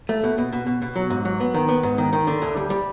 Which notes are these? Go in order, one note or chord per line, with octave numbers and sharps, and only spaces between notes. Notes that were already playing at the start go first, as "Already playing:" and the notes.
A3
B2
B2
B2
B2
B2
F#3
G#2
F#3
B3
D#3
B3
G#2
D#3
D#3
D3
D2
G3
G3